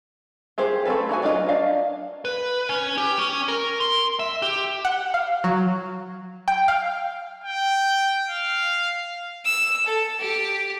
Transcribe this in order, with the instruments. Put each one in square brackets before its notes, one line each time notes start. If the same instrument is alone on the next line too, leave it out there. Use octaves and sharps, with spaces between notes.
[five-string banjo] F4 G4 G#4 C5
A3 C4 D#4 A4 B4
D#4 F#4 F#5 G#5
F#3 D4 F4 G#4 D#5
D4 F5
[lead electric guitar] B4
C#4
G4
C#4
A#4
C6
E5
G4
[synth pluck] F#5
F5
F#3
G5
F5
[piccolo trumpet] G5
F5
[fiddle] E6
A4
G4